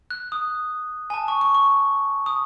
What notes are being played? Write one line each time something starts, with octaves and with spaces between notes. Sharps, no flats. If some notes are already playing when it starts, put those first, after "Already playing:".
F#6
D#6
G#5
A5
C#6
C#6
C#6
D#6